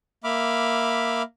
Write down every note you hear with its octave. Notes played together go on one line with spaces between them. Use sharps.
A#3 E5 B5 D6 F6